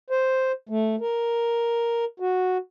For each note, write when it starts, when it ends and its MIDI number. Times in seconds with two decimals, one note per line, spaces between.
0.10 0.52 72
0.69 0.96 57
1.01 2.05 70
2.20 2.58 66